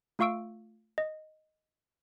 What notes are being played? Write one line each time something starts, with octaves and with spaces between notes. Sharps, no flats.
A3 F4 F5 C#6 E6 D7
D#5